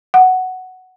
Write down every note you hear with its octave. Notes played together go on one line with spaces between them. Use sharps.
F#5